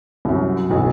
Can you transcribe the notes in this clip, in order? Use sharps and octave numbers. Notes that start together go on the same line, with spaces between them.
C2 F#2
F#1 B1 B2